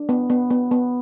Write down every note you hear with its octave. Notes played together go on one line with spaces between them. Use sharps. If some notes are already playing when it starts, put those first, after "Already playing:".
Already playing: D4
B3
B3
B3
B3